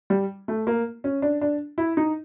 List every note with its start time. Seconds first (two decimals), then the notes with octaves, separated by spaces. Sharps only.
0.10 G3
0.48 A3
0.67 A#3
1.04 C#4
1.22 D4
1.41 D4
1.78 E4
1.97 D#4